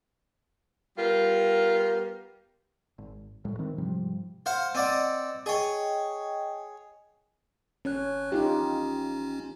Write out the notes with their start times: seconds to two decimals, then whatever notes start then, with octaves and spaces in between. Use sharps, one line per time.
0.97 G3 B3 F4 A#4
2.98 G#1
3.45 C2 A2 G#3
3.59 D#3 E3 C4
3.78 G#2 C3 F3 G3
4.46 C5 F5 F#5
4.75 C4 D5 D#5 F#5
5.46 G#4 C#5 D#5 G5
7.85 G#1 C#4 C#5 F#6
8.32 A1 C#4 D#4 F4 G4